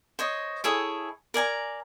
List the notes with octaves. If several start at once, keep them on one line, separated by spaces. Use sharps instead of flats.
C5 C#5 D#5
E4 G#4 A4 C#5
A#4 D5 G#5 A#5